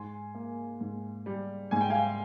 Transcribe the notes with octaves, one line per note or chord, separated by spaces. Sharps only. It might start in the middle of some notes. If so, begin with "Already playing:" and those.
Already playing: G#2 G#5 C6
A#3
G#2
G3
G#2 G#5
G5
F5 G#5